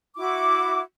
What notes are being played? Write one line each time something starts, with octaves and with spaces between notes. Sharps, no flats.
E4 F#4 D6